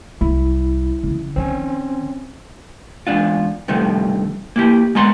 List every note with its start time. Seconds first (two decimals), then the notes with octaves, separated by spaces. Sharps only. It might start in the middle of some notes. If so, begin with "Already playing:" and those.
0.21 C2 E4
1.03 C#3 E3
1.36 D#3 F3 C4 C#4 G#5
3.07 E2 G#2 D4 F4
3.68 G2 C3 D#3 F3 A3
4.56 A#3 E4 G4
4.95 G#3 B3 A#5 C6